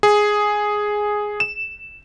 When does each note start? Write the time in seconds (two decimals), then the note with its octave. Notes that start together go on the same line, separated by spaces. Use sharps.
0.03 G#4
1.40 E7